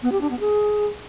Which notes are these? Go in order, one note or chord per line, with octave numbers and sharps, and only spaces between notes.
B3
G4
D4
B3
G#4